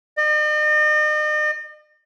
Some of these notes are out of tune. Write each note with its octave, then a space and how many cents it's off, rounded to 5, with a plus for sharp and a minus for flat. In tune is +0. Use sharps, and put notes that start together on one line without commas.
D#5 -45